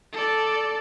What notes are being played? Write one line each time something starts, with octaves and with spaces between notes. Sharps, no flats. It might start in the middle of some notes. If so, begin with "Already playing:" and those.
A4 D5